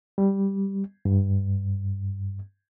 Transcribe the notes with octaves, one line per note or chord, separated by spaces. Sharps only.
G3
G2